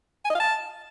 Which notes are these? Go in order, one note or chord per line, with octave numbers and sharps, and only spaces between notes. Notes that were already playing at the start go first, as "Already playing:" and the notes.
G#5
D#5
F5
A5